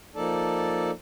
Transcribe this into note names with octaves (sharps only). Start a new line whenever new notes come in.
F3 A#3 D#4 A4 D5 A5